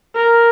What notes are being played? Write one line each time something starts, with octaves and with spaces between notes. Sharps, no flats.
A#4